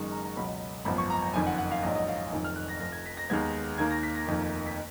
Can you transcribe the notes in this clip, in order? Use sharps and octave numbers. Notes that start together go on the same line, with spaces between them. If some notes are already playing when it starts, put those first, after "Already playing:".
Already playing: F#1 F#2 D#3 G#3 C#6
A#5
A#5
C#2 B2 F#3 B5
G#1 F#2 F3 B3 B5
C#6
A#5
A#5
F#1 F2 D#3 G#5
F#5
F#5
F5
A#1 G#2 F#3 D#5
D#5
F5
F1 F2 D#3 F#3 G#5
F6
F#6
A#6
F1 F2 F3 A#6
G#6
B6
A#6
D#2 D#3 G#3 B3 G#6
D#2 D#3 A#3 G#6
A#6
B6
A#6
F1 F2 D#3 A#3
B6